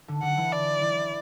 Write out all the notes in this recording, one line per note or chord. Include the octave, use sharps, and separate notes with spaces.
D3
D3 F#5
E3
D5
E3